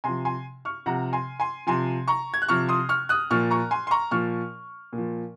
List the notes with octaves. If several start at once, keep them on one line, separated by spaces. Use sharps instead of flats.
C3 F3 G#5 C6
G#5 C6
C#6 F6
C3 F3 F#5 A#5
G#5 C6
G#5 C6
C3 F3 G#5 C6
A#5 C#6
G#6
F#6
C3 F3 C#6 F6
C6 D#6
C#6 F6
D#6 F#6
A#2 F3 C#6 F6
A#5 C#6
G#5 C6
C6
A#5 C#6
A#2 F3 C#6 F6
A#2
F3